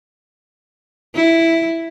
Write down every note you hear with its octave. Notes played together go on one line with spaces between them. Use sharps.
E4